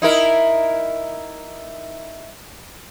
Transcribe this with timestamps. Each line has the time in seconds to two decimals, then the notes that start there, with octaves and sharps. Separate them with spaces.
0.02 D#4 E4 A#4